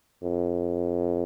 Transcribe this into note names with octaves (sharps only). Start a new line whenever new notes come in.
F2